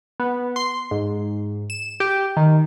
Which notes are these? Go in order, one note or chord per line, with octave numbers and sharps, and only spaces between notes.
B3
C6
G#2
E7
G4
D#3